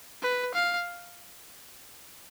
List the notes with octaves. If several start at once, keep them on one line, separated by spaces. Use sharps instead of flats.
B4
F5